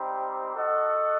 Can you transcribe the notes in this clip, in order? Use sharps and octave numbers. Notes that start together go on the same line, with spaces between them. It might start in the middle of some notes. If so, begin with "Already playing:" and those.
Already playing: G3 C4 D#4 G4
F#4 A4 D#5 F#5